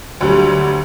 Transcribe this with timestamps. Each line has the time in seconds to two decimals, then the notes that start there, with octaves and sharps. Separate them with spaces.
0.21 D2 D3 F#3 G3